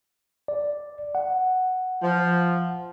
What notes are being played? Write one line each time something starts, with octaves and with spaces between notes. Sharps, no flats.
D5
F#5
F3